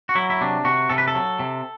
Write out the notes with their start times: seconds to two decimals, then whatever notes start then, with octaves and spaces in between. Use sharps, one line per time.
0.09 F#4
0.15 F#3 E4
0.30 E4
0.41 C3 D4
0.65 C3 F#4
0.90 C3 A4
0.98 B4
1.08 A4
1.15 F#3
1.39 C3